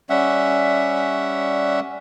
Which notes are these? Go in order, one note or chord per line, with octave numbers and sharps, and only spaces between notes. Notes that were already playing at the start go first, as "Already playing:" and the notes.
G3 C#4 E5 F#5